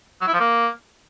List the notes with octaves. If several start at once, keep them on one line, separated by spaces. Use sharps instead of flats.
F#3
E4
F3
A#3